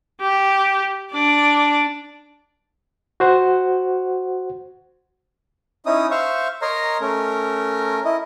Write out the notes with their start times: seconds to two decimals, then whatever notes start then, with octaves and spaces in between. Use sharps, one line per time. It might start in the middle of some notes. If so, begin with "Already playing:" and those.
0.21 G4
1.12 D4 D5
3.20 F#4 C5 F#5
5.86 C#4 D#4 E4 D#6
6.11 C5 E5 F5 C#6
6.62 A#4 C#5 D#5 A#5 C6
7.01 A3 C#4 A#4
8.05 E4 D#5